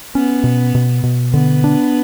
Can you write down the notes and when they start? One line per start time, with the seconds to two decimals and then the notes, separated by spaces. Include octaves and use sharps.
0.15 B3 C#4
0.44 B2
0.75 B2
1.04 B2
1.33 D3 B3
1.64 D4